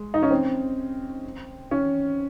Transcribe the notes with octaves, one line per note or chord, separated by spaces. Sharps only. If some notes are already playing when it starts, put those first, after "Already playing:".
Already playing: G#3
D#4
C#4
C4
C#4